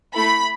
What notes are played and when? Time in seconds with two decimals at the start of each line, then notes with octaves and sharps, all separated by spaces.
0.14 A3 E4 A4 B5